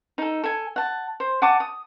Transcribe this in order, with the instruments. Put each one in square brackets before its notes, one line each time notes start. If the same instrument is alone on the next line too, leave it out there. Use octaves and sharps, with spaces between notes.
[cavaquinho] D#4 A4
A4 G#5
F#5 A5
C5
F#5 G#5 A5 D6
D#6